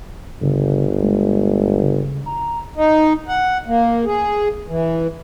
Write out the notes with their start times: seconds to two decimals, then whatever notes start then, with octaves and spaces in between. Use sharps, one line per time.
0.41 G1 C#3
1.02 G#3
1.83 C#3
2.26 A#5
2.75 D#4
3.28 F#5
3.66 A#3
4.05 G#4
4.68 E3